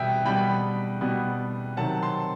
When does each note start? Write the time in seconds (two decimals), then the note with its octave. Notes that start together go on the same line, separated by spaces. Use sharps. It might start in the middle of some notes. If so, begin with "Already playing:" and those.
Already playing: B2 G3 B3 E5 G5
0.25 B2 G3 B3 G5 B5
1.01 B2 G3 B3
1.77 C3 D#3 F#3 F#5 A5
2.03 A5 C6